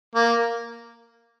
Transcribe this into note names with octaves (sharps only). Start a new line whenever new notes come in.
A#3